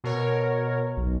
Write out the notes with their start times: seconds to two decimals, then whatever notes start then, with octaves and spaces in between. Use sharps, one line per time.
0.04 B2 A#4 C#5
0.97 B1